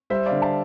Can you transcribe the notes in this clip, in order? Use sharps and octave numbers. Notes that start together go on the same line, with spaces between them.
G3 C5 E5
D3 D5 F5
F5 A5